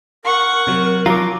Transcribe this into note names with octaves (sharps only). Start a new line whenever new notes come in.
A#4 F#5 C#6
C3 F#3
F3 F#3 F4 A#5 D6